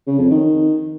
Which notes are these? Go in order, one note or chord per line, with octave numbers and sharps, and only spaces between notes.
C#3
F2
D#3